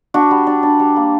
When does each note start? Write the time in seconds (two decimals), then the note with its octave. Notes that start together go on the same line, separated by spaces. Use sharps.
0.14 D4 F#4
0.31 G3
0.47 D4
0.63 D4
0.80 G3
0.96 A#3